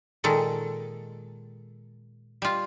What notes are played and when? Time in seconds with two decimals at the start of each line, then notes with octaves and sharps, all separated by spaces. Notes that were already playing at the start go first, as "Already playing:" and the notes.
0.24 A#2 D#3 G#3 A4
2.42 G3 F4